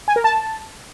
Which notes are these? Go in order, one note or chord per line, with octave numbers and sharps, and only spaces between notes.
G#5
A#4
A5